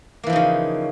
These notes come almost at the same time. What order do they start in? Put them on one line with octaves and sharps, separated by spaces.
A#3 E3 F3 D#4 C#3